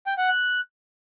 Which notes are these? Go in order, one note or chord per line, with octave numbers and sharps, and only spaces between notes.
G5
F#5
F#6